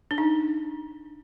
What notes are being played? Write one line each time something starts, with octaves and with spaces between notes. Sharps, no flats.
D4
D#4